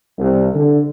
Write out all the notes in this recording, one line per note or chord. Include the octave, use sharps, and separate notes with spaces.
C2
D3